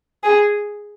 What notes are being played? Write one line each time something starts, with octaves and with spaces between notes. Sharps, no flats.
G#4